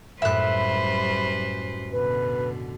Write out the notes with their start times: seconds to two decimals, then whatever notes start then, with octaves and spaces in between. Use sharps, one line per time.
0.22 F#2 A2 G3 B4 C5 E5 B5 F#6
1.92 B2 D3 B4